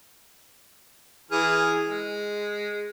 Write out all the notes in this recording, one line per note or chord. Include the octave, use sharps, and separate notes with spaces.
E3 G#4 F6
G#3